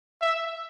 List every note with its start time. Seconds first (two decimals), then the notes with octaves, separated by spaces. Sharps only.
0.22 E5